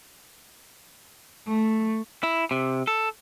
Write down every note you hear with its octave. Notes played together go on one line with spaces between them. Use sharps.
A3
E4
C3
A4